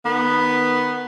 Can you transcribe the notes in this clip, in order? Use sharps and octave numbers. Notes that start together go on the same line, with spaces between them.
D#3 B3